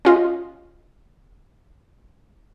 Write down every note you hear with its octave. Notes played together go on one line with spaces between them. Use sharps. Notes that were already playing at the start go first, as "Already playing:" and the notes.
C#4 F4 D#5